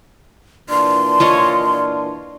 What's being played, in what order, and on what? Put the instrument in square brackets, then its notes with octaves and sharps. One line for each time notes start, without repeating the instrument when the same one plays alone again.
[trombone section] A#2 E3 D4 [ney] C6
[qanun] F4 C#5 D#5